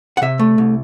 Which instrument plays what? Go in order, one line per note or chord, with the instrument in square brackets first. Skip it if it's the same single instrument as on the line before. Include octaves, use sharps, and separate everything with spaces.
[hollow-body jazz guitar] F#5
C3 E5
A3
C2